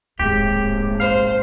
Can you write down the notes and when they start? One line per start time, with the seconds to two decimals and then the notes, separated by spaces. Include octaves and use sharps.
0.20 D1 G#1 D#2 A3 G4
1.00 A2 C#3 C5 F5